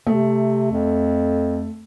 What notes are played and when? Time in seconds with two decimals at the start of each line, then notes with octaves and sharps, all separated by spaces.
0.07 C3 A3
0.72 F2